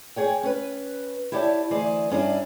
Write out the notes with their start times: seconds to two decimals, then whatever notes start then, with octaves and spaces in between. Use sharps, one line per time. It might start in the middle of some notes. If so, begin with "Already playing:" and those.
0.16 G#4 C#5 G5
0.43 C#4 B4
1.32 E4 G4 C#5 D5 F#5 A5
1.71 D2 E3 G#4 C5 D5 D#5
2.10 G2 C#4 D4 E4